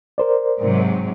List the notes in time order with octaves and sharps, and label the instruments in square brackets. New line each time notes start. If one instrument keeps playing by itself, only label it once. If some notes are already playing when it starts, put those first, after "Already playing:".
[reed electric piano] A#4 C5 D5
[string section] G#2 C3 F#3